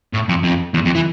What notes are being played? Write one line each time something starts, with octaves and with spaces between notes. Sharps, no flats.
A2
F2
F2
E2
F2
E3